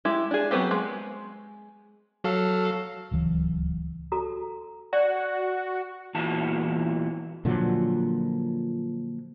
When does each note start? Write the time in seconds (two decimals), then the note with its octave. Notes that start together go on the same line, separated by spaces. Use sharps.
0.05 G#3 E4 G4
0.31 D4 G#4
0.51 F#3 G#3 B3 C4 G4
0.71 G#3
2.24 F#3 A4 F5
3.11 D1 C#2 E3 F#3
4.12 F#4 A4 A#5
4.93 F#4 D5
6.15 E2 A#2 E3 F#4 A5
7.45 A#2 D3 F3 F#3